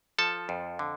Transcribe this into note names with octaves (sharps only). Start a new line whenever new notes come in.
F3 A4 A5
F2
D3